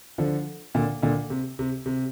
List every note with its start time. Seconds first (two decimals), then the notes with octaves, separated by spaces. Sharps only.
0.18 D3 F3
0.75 A#2 D3
1.02 A#2 D3
1.30 C3
1.59 C3
1.86 C3